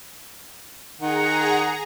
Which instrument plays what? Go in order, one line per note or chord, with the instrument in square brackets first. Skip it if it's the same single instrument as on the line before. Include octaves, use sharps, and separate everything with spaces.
[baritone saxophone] D#3 [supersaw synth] G#4 A#5 [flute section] F#5